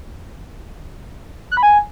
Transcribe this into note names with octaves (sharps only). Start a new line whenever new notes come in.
F#6
B5
G#5